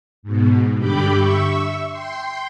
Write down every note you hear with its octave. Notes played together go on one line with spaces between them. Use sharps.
G#2 B2
G2 D3 G4 B5 D6 G6
E5 C#6 E6
G5 C6